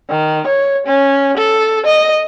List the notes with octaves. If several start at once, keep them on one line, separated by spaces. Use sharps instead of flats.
D#3
C#5
C#4
A4
D#5